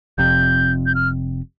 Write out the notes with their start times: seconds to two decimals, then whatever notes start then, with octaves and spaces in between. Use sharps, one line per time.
0.18 F1 F2 C3 G6
0.86 G6
0.95 F6